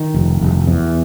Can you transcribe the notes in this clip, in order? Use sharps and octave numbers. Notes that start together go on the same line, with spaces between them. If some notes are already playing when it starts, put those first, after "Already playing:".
Already playing: D#3
F1
F1
E2